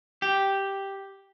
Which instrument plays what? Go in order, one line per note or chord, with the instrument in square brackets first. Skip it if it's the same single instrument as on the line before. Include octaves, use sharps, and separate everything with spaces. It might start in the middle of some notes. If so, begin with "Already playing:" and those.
[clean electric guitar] G4